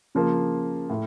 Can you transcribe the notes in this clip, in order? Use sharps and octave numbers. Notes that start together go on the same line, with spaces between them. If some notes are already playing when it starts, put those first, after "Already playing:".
C#3 F3 A#3
A2